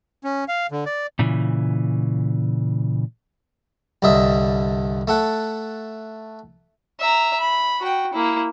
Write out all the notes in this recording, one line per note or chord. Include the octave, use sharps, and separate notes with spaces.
C#4
F5
D3
D5
A#2 C#3 E3
C2 G2 D3 D#5 E5
A3 A4 F#5
E5 A#5
B5
F#4 G5
A#3 E4